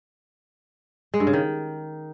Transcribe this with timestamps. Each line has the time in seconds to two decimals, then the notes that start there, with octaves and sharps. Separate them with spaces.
1.14 G#3
1.20 G2
1.27 C#3
1.33 D#3